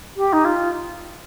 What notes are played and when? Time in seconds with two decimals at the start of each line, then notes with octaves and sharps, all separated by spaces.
0.16 G4
0.32 D#4
0.44 F4